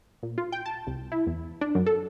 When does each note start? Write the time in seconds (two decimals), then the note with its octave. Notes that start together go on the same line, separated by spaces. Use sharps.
0.23 A#2
0.38 F4
0.52 G5
0.66 A5
0.87 C2
1.12 E4
1.27 E2
1.61 D4
1.75 F#2
1.86 A4